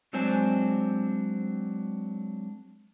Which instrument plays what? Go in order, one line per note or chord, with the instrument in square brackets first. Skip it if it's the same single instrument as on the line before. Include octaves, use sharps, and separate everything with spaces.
[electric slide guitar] F#3 G#3 C4 D4 C5 G#5